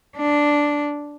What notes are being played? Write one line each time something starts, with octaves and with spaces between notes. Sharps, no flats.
D4